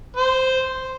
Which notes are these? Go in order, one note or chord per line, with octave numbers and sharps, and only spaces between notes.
C5